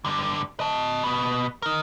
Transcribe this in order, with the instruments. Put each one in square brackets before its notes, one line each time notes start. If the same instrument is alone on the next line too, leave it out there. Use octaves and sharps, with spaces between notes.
[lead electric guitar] G2 D3
D#5 A5
B2 B3
D#4 A#4